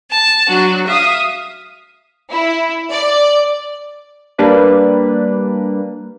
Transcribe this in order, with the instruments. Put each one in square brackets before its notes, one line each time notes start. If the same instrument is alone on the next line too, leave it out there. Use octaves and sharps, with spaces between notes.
[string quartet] A5
F#3 D4 F#4
E5 F5 D#6
[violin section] E4
D5
[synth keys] G3 A#3 D4 B4 D5